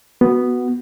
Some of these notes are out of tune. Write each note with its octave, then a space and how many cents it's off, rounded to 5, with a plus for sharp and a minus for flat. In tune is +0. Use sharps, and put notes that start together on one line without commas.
B3 +0 F#4 +0